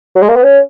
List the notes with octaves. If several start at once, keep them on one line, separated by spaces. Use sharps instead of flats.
F#3
G#3
A#3
B3
C#4